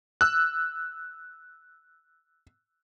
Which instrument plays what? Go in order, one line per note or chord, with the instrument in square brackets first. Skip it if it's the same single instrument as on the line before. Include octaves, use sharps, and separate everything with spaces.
[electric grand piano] E6 F#6